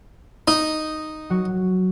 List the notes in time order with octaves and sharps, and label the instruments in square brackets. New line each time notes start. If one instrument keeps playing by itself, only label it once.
[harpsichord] D#4
[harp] F#3 F#4